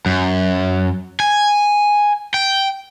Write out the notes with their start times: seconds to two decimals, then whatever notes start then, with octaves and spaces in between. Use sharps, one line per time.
0.06 F#2
1.20 G#5
2.34 G5